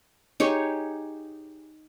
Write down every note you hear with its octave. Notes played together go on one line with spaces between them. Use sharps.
D#4 G4 G#4 C#5